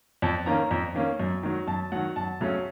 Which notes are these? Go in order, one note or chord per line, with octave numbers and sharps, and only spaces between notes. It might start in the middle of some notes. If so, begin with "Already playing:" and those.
F2 A5
D#3 A#3 C#4 A#5
F2
D#3 A#3 C#4
F#2
D#3 F#3
F#2 A5
D#3 F#3 F#5
F#2 A5
C#3 F#3 A3 C#4